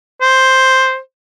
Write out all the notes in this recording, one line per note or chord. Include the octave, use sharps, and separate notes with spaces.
C5